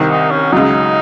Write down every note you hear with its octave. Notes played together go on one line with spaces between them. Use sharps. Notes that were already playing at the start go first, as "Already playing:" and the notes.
Already playing: C2 C3 D#3
D#4
C#4
C#2 C#3 F#3 D#4